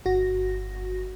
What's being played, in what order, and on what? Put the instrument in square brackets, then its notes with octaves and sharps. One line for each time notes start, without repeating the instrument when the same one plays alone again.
[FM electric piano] G1 F#4 A#6